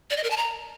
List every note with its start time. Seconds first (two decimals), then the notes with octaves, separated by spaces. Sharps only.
0.10 D5
0.17 D#5
0.24 A#4
0.30 A5
0.37 A#5